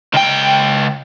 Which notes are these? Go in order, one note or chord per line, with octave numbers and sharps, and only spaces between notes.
C#2 G5